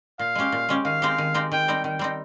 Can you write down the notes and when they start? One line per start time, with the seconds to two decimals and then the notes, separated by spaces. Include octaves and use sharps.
0.19 A#2 F5
0.35 G#3 C#4 G4
0.52 A#2
0.69 G#3 C#4 G4
0.85 D#3 F5
1.02 G#3 C4 D#4 G4
1.18 D#3
1.34 G#3 C4 D#4 G4
1.52 D#3 G5
1.68 G3 C4 D#4
1.84 D#3 G5
1.99 G3 C4 D#4